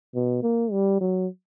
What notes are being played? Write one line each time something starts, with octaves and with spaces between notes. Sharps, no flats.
B2
A#3
G3
F#3